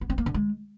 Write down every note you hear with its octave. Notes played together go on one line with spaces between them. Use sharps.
B3
C4
A#3
D3
G#3